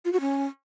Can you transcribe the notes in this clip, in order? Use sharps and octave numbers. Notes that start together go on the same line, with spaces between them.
F4
F#4
C#4